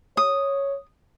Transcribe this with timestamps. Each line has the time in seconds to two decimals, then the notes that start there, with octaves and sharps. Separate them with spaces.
0.17 C#5 D#6